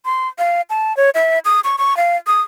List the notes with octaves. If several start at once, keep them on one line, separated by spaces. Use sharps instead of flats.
C6
F5
A5
C#5
E5
D#6
C#6
C#6
F5
D#6